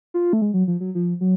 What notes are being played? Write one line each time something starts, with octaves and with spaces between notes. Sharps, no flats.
F4
A3
G#3
F#3
F3
F#3
F3
F#3